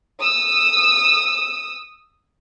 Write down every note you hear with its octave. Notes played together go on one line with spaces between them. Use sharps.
D#6 E6